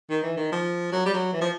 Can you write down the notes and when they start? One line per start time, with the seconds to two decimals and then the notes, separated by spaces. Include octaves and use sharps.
0.10 D#3
0.23 E3
0.37 D#3
0.52 F3
0.92 F#3
1.06 G3
1.13 F#3
1.33 E3
1.41 F3